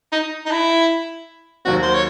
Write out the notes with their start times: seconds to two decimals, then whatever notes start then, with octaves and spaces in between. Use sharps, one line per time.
0.12 D#4
0.46 D#4
0.51 E4
1.65 D#2 D#3 F#3 C4 F#4
1.83 C5
1.94 C#5